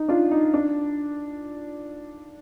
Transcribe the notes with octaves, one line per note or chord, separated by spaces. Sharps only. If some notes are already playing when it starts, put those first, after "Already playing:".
Already playing: D#4
D4 F4
D#4
D4